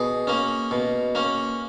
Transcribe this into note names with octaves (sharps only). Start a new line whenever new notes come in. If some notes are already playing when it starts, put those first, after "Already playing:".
Already playing: B2 G#4
A#3 C#4
B2
A#3 C#4